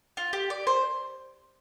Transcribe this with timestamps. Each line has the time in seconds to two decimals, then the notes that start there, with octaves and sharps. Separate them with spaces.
0.17 F4
0.33 G4
0.50 D5
0.67 C5